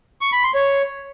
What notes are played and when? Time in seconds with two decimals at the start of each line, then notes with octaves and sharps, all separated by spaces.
0.21 C#6
0.32 B5
0.43 C6
0.55 C#5